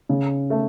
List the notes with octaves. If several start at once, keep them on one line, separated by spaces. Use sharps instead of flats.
C#3
A3